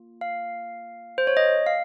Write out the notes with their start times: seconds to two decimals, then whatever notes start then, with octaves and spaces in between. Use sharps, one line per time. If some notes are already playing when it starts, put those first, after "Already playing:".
Already playing: A#3 F4
0.21 F5
1.18 C5
1.27 C#5
1.37 D#5
1.67 F5